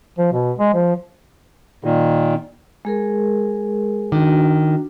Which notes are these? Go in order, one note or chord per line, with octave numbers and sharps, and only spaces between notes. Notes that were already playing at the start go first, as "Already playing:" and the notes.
F3
B2
G#3
F3
A#2 D#3
G#3 G#4 A#4
D#3 D4 F#4